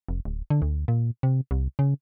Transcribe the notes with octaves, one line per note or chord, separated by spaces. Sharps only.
F1
D1
D3
D2
A#2
C3
C2
C#3